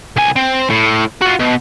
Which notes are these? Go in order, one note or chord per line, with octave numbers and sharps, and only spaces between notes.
C2 G#5
C4
A2
F4 F#4
B2